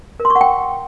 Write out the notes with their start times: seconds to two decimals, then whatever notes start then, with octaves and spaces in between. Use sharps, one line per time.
0.20 A#4
0.25 C6
0.30 C#6
0.35 F#5
0.41 G5